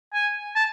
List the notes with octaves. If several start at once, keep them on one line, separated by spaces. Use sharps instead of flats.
G#5
A5